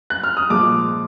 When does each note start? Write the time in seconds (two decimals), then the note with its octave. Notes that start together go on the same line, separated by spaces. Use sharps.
0.10 F#6
0.24 F6
0.37 D#6
0.50 A#2 F3 G#3 D6